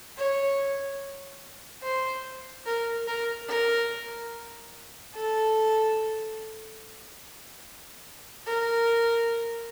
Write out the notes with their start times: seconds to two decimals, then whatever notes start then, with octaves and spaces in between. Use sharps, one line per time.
0.18 C#5
1.83 C5
2.67 A#4
3.08 A#4
3.49 A#4
5.15 A4
8.47 A#4